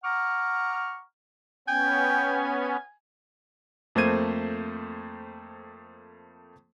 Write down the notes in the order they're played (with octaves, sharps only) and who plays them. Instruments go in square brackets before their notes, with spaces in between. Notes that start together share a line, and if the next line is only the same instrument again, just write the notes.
[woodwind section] F#5 A#5 C#6 D6 F6
[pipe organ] B3 C#4 [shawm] G5 [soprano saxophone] G#5
[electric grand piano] F2 A3 A#3 C5 G#6 D#7